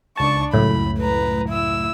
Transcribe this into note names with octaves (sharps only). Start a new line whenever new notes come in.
C#2 D4 A5 C#6
C#2 F#2 A2 B5
B4 A#5
E4 E6